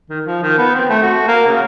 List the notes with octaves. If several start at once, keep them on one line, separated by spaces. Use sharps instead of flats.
D#3
F3
D#3
B3
C4
A3
F#4
A#3
C#3